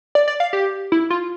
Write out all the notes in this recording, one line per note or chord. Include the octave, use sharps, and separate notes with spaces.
D5
D5
F5
G4
E4
F4